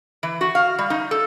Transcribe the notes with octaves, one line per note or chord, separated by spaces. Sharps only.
E3
F#4
F5
G3
D#4
A4